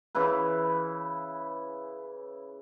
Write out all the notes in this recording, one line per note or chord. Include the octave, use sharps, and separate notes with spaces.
C#3 E3 E4 B4